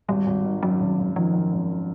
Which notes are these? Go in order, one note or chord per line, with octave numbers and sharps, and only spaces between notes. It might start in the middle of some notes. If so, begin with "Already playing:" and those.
G#1 G3
G#1
D#3
F#2 F#3
G#1
G#1
D#3 F3
F#2
G#1